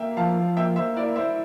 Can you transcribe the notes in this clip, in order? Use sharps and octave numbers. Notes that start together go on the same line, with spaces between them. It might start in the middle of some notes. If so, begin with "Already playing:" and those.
Already playing: A#3 E5 G5
F3 F5 A5
A#3 E5 G5
C5 E5
E4 A#4 D5
C5 E5